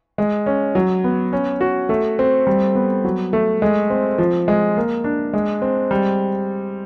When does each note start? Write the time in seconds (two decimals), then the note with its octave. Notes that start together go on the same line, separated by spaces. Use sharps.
0.18 G#3
0.46 C#4
0.75 F#3
1.04 B3
1.33 C#4
1.61 F#4
1.89 A3
2.19 C4
2.47 G3
2.75 B3
3.04 F#3
3.33 A3
3.62 G#3
3.90 C4
4.18 F3
4.48 G#3
4.77 A#3
5.04 D4
5.34 G#3
5.62 C4
5.91 G3